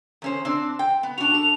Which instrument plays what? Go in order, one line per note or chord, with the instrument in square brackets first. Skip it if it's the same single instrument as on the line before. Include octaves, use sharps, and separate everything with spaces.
[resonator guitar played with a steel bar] E2 C#4 C5
C4 D4
G5
B3
[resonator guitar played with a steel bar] D4 F#4 [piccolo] F7
[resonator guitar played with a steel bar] A4